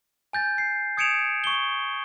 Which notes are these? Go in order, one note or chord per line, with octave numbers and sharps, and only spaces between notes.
G#5 G6 A6
C7
D#6 G#6 C#7 D7 E7 F7
C#6 G7